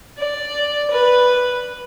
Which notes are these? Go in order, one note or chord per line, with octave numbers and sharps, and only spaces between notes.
D5
B4